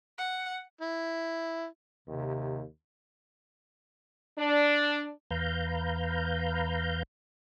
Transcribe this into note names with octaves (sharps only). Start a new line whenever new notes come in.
F#5
E4
D#2 C3
D4
E2 B4 F5 A#5 G6